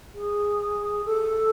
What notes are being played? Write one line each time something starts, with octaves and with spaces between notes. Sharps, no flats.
G#4
A4